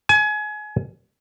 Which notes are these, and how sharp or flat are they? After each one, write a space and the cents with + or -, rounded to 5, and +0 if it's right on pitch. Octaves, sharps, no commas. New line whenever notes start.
G#5 +30